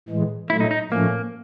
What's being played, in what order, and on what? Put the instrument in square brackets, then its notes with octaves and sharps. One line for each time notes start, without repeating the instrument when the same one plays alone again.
[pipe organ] A2 E3 G#3
[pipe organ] A#2 F#3 A3 [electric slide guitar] E4
[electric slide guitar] D#4
D#4
[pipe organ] A2 F3 A3 C#4 [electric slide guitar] A#3